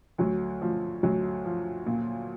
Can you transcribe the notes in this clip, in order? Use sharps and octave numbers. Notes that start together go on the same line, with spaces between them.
D2 F#3
D2 F3
D2 F#3
F3
A#2